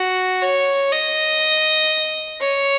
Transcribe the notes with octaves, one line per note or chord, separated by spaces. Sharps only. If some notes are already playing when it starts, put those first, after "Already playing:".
Already playing: F#4
C#5
D#5
C#5